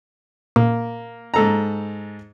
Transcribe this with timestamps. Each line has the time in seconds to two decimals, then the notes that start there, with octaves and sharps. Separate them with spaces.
0.56 A#2 A#3
1.34 G#2 A4 A#5